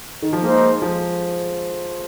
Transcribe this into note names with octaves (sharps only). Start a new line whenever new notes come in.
D#3
F3
G#3 A#3 D#4 C5
F3